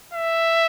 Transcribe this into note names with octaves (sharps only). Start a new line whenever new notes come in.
E5